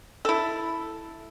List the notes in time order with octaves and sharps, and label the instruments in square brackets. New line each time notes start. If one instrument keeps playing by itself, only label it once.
[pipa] E4 A4